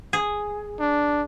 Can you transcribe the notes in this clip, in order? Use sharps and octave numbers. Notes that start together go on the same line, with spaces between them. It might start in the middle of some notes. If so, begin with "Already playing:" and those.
G#4
D4